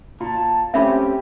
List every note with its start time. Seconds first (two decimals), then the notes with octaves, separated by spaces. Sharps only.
0.20 A#2 A5
0.74 A3 C4 C#4 G4 E5 B5